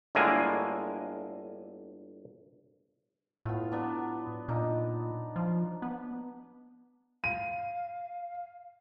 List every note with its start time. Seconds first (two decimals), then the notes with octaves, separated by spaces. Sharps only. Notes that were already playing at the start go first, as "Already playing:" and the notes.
0.15 G1 A2 D3 G#3 A#3 G#5
3.45 A2 B3 F4
3.72 F#3 B3 D4
4.48 A#2 D4 D#4
5.36 F3
5.82 B3
7.24 F5 D#7